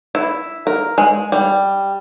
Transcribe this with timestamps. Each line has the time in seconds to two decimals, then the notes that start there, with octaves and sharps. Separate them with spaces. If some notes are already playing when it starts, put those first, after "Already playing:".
0.15 E4
0.67 A#4
0.98 G#3
1.32 G3